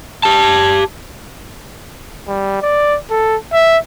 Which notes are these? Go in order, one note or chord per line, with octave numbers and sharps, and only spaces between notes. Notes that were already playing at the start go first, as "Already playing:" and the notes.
G4 A5
G3
D5
A4
E5